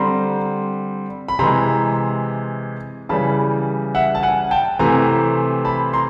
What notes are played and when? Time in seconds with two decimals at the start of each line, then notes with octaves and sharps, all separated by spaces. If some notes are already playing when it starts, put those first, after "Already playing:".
Already playing: D3 G3 C4 A#5 C6
1.28 B5
1.39 C3 E3 G#3 A#5 C6
3.09 C#3 E3 G3 A5 B5
3.95 E5 F#5
4.15 A5
4.23 F#5 G#5
4.51 G5 A5
4.79 C3 E3 A3 C4 G#5 A#5
5.65 A5 B5
5.93 A#5 C6